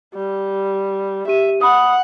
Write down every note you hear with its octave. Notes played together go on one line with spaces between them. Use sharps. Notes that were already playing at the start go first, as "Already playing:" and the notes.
G3
G4 E5 D#7
F#5 B5 D#6